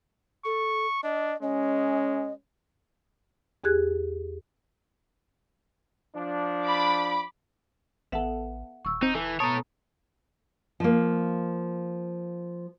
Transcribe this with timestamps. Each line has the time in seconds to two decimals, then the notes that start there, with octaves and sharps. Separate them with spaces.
0.45 A4 C#6
1.03 D4 D#5
1.42 G#3 C#4 D#5
3.64 E2 G4 G#4 F#6 G#6
6.15 F3 D4
6.65 B5 D6
8.12 A1 B3 A4 E5 F#5
8.85 D#1 C#6 E6
9.03 C4 D#4 G6
9.15 E3 A4
9.40 B2 B3 A4 C#5 A5 A#5
10.80 F3 A#3